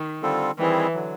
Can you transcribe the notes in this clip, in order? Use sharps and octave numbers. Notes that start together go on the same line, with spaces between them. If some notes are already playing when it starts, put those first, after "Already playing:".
Already playing: D#3
D3 G3 C4 F4 A4
D#3 E3 G3 C4 E4 G#4
D3 F#3